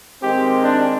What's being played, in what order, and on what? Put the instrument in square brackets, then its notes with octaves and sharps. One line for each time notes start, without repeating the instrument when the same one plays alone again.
[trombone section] D#3 G#3 C4 [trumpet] G4
[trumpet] D4